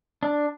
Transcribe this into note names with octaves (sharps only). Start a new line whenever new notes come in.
D4